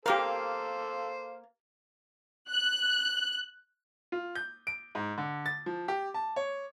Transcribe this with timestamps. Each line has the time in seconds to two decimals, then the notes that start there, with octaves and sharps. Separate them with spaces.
0.06 A#3 G4 A4 A#4 C5 F5
2.50 F#6
4.12 F4
4.35 G6
4.67 D7
4.95 G#2
5.18 D3
5.46 A6
5.66 F3
5.88 G4
6.14 A5
6.36 C#5